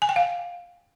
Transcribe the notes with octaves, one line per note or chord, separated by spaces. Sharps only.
G#5
G5
F5